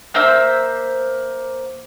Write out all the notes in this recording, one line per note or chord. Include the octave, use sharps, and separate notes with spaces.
A#3 C5 E5 E6